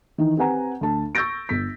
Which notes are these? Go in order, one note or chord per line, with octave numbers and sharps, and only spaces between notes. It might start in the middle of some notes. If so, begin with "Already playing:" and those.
D#3 E3 D#4
C4 G4 B4 F#5 G#5 A#5
D2 A5
C#6 E6 G6 A6 A#6 D7
G1 B6